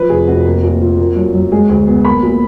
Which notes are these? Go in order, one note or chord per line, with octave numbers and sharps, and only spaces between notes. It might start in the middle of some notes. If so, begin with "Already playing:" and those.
Already playing: F3 B4
F1 G#4
F1 F#4
A#3
A#2
F4
A#3
F#2
F#2
G#3 G#4
D2
B3
A#3 B5
A#2